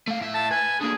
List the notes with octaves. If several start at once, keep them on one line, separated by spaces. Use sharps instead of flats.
A3 F5
A2 E5
A5
B4 G#5
D3 A#3 G#4